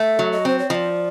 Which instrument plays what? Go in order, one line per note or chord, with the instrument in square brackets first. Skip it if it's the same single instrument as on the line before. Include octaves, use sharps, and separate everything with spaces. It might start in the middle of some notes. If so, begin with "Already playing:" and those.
Already playing: [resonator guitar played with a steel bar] A3 [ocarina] E5
[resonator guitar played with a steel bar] F#3
[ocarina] D#5
[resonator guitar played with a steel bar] C4 [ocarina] C5
[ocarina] C#5
[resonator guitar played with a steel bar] F3 [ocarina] D#5
[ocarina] D5